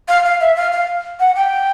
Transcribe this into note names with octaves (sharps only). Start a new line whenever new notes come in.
F5
F5
E5
F5
F5
F#5
G5